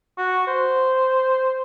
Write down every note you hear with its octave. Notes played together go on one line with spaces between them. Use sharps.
F#4
C5